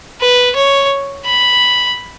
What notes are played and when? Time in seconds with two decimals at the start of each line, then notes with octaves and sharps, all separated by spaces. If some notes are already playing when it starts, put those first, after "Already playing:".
0.21 B4
0.56 C#5
1.26 B5